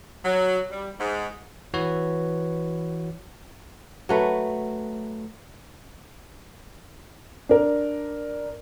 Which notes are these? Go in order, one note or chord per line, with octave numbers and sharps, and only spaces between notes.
F#3
G3
G#2
E3 F#4 B4 C#5
F#3 A3 B4
D4 A#4